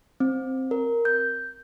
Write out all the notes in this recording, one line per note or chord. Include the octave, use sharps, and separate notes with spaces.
C4
A#4
G6